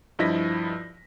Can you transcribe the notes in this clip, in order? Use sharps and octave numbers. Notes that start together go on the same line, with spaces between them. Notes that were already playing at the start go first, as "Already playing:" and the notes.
G2 F3 E4 D#5 A#6 B6